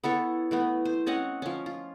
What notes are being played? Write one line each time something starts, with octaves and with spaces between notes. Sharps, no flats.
B3 E4 A4 C#5
E3 A3 B3
C5
C4 C#4 D#5 F#5
F3 C#4
F4